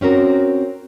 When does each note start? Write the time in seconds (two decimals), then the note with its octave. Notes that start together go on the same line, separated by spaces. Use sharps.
0.01 C4 C#4 F#4 A#4